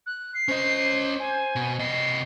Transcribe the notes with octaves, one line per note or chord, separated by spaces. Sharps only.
F#6
C7
C#4 C5 D#5
G#5
B2
C3 D#5 C7